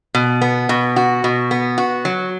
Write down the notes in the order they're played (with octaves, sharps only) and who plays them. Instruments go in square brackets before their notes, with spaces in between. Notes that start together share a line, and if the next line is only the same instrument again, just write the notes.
[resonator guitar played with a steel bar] B2
B3
B2
F#4
B2
B3
F#4
F#3